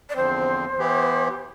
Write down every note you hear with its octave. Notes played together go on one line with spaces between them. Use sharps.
D5
E2 D3 F3 C4 C5
E3 B3 E4 G4
G4